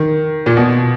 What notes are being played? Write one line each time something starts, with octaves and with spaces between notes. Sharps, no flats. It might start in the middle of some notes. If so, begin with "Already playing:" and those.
Already playing: D#3
A#2
B2